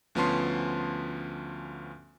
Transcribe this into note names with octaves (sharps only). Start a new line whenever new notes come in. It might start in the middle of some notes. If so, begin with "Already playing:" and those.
D2 F3 B3 C#4 A5 C6